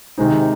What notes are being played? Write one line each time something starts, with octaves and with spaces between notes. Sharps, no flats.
C3 D#3 G#3 C4 D#4